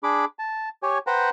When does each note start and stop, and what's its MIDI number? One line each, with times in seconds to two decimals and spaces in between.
0.03 0.25 62
0.03 0.25 68
0.03 0.25 83
0.03 0.25 86
0.39 0.69 81
0.83 0.98 67
0.83 0.98 73
0.83 0.98 80
1.07 1.30 71
1.07 1.30 72
1.07 1.30 78
1.07 1.30 79
1.07 1.30 82